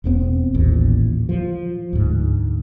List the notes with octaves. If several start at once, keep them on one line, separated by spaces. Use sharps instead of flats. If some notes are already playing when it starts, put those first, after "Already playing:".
E1 G2 B3 C4
A1 D#2 A#2
F3
D2 G#2